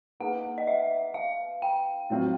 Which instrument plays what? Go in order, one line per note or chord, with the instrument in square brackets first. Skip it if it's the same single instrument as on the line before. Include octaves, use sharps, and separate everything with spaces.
[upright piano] A#3 D#4 G#4 B4 [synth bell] F#5
[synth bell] D#5
E5
F5
G5
[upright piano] A2 F#3 A3 C4 F4